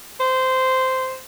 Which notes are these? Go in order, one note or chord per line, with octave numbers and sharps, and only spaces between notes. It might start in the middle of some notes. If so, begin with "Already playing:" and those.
C5